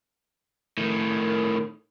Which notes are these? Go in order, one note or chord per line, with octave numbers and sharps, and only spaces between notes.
A2 D#3